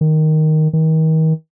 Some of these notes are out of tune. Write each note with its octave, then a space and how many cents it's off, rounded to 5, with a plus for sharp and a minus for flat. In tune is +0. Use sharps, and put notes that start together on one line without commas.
D#3 +0
D#3 +35